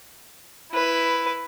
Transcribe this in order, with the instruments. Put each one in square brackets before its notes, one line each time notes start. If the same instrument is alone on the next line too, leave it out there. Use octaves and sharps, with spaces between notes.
[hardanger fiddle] E4 B4